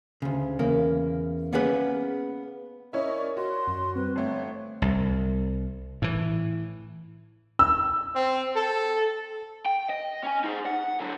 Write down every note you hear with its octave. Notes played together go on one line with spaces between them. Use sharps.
D2 C#3
E2 C#3 A#3
A#3 B3 C#4 G#4 B4
C#4 E4 A#4 C#5 D#5
D5
F#4 C6
F#2
G3 C4 B4
G1 A3 C#5
C2
A2 E3
E6
C4
A4
G5
D#5
C#4 G#5
D#4 G#4
F#5
D3 F#3